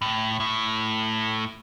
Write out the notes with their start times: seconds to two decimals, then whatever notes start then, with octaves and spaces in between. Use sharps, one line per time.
0.02 A2
0.40 A2